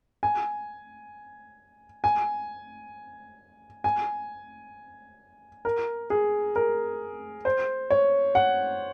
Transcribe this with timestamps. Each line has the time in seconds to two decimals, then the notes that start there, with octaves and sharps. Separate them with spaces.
0.23 G#5
2.04 G#5
3.84 G#5
5.65 A#4
6.10 G#4
6.56 A#4
7.45 C5
7.90 C#5
8.35 F#5